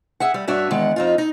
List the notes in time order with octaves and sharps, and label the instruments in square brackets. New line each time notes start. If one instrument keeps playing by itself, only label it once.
[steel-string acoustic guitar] G#4 E5 F#5
G3
G2 D4 F#4 C#5 E5
E2 D#3 G#3 F#5
F2 D#4 F4
D#4